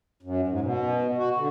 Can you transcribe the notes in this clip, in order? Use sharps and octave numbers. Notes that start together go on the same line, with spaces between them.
F#2
G#2
B2
F#4
D3